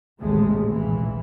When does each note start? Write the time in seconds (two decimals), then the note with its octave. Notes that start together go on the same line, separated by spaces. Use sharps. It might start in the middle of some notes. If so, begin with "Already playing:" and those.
0.20 A1 D#2 C3 G#3 A3
0.67 A#1 A#2 E3